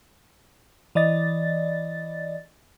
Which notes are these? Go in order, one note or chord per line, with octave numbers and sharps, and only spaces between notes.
E3 D5 D#5 A6